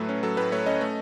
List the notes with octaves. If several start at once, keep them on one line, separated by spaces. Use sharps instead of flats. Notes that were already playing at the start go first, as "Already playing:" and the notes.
Already playing: A2 F#3 A3 B4
C#4
F#3 A4
A2 B4
A3 C#5
C#4 D#5
A3